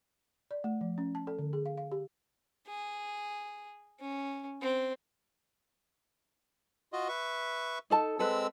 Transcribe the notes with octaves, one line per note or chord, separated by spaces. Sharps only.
D5
A3
F3
C#4
A5
A4
D3
G#4
F5
F5
G4
G#4
C#4
C4
F4 F#4 D#5
B4 E5 C#6
D#4 A4 A5
G#3 C4 A4 B4 E6